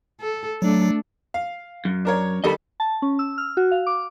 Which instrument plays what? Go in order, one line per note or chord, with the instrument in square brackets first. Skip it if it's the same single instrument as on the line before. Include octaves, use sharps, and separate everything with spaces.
[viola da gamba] A4
[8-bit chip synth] F#3 [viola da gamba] A3 D4 A4
[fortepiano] F5
[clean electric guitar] F#2
[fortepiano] D4 A#4 C#5
[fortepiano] D#3 G3 A4 [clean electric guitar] D#5 B5
[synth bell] A5
C#4
E6
F6
F#4
F5
D6